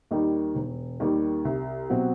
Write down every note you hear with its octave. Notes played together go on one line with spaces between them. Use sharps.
D#2 D#3 G3 D#4
E1
D#2 D#3 G3 D#4
C2
B2 F#3 C4 F#4